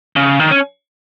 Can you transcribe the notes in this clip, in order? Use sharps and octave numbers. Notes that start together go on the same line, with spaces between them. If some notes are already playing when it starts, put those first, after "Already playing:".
C#3
D#3
C#4